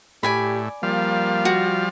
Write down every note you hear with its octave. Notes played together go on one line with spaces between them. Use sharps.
A2 G4 D5 G#5 B5
F3 G3 A#3 F5
F#4